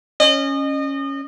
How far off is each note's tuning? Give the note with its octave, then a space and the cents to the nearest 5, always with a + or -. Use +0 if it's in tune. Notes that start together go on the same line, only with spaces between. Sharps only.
C#4 -5 D#5 -30